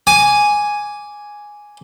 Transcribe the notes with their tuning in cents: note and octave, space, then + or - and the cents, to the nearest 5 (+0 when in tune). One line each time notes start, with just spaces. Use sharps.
G#5 +0 D6 -10